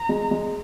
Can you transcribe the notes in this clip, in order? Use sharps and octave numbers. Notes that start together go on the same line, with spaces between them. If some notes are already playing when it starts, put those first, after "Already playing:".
Already playing: A#5
G#3
G#3